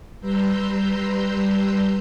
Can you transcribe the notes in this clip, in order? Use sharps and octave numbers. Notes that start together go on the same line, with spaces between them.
G3 B4 A#5 C6 E6 G6